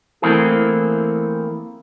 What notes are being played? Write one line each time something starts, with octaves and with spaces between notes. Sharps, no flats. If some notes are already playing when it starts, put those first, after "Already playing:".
E3 A3 A#3 C4 E4 G#4